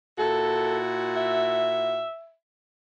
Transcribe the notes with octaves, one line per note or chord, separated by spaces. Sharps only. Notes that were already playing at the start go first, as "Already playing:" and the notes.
A#2 E4 F#4 A4
E5